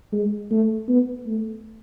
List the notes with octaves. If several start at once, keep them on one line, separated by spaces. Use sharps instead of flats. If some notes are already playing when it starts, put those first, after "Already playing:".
G#3
A3
B3
A3